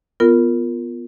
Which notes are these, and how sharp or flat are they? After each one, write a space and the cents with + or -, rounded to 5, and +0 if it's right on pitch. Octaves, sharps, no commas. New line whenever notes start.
B3 +0 F4 +0 A#4 -10